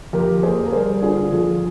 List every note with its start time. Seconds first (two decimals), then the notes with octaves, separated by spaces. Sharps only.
0.13 F2 G4 A#4
0.43 A#3 G#4 C5
0.66 A#4
0.72 G3 G#4 C5
1.02 D3 F4 G#4
1.32 F2 F4 G#4